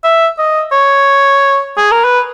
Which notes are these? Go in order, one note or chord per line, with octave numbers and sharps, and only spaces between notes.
E5
D#5
C#5
G#4
A#4
B4